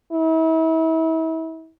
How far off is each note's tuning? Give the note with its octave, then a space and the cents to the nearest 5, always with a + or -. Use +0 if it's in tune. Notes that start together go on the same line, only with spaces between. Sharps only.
E4 -35